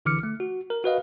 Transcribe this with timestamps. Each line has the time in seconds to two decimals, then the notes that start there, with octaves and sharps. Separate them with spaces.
0.05 A#1 D3 E3 D6 F6 C#7
0.23 A3
0.40 F#4
0.70 A#4
0.84 F#4 B4 D#5 F5